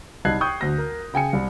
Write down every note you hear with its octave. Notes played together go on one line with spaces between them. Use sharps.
C2 D#4 A5 F#6 G#6 C7
G5 C#6 D#6 G6
D2 A#6
A#4
C#3 G5 G#5 C#7
C2